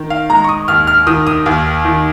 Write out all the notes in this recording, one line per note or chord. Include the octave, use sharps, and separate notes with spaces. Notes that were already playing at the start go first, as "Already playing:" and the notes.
Already playing: D#3
F5
G#3 A#5
C#6
D#6
D#2 F6
F6
D#3 D#6
D#6
D#2
D#3